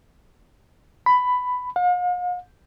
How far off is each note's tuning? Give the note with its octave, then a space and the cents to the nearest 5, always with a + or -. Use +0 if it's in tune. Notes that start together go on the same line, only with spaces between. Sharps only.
B5 +10
F5 +45